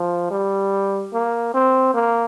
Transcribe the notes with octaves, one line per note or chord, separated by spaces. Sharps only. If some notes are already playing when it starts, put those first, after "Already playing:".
Already playing: F3
G3
A#3
C4
A#3